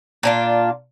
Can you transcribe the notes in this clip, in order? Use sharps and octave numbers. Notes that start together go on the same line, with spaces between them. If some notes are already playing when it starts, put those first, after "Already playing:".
A#2 D4 F4